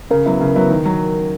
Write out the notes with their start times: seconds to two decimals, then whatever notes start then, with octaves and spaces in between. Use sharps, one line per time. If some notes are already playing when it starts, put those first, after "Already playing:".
0.11 C#3 A#4
0.26 F#3 B3 E4
0.41 C#3
0.56 F#3 B3 E4
0.70 D#3
0.85 F#3